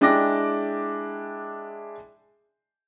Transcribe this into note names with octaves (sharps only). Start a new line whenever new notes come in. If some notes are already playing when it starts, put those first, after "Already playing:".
G#3 D4 E4 G5 D6 A#6